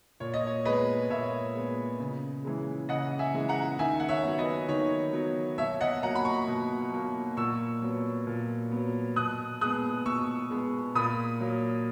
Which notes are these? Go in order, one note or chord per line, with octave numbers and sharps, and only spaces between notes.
A#2 C#5
D#5
C#5
G#3 B3 B4 D#5
A#2 C#5 E5
G#3 B3
C#3
E3 G#3
C#3 D#5 F#5
E5 G#5
E3 G#3
F#5 A#5
D#3 E5 G#5
F#5
C#5 E5
F#3 B3
B4 D#5
D#3 C#5
F#3 B3
B2 C#5 E5
D#5 F#5
F#3 A#3 F#5 A#5
B5
A#5 C#6
B2
F#3 A#3
A#2 C#6 E6
F#3 B3
A#2
F#3 B3
B2 D#6 F#6
G#3 B3 D#6 F#6
B2 C#6 E6
G#3 B3
A#2 B5 D#6
F#3 A#3